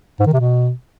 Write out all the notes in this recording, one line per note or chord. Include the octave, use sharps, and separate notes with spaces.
G#2
D#3
C3
B2